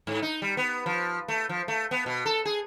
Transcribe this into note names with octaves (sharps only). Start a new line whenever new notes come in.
G#2
D#4
G3
B3
F3
A3
F3
A3
B3
B2
A4
G#4